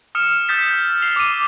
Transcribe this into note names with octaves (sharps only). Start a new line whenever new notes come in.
D#6 F6 C#7 E7
D#6 E6 G6 A6 B6 E7
G6
C7 F7 G7
D6 D#7